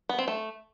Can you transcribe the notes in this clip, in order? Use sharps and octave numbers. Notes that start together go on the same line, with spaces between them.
B3
C4
A3